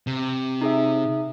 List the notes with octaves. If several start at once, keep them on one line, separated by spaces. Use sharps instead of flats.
C3
D#4 G#4 E5